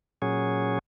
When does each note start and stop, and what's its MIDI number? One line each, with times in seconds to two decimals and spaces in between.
0.22 0.79 46
0.22 0.79 54
0.22 0.79 61
0.22 0.79 68